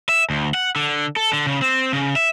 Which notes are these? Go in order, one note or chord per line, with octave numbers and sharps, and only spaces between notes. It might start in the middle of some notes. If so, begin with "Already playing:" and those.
E5
D2
F#5
D3
A4
D3
C#3
C4
C#3
E5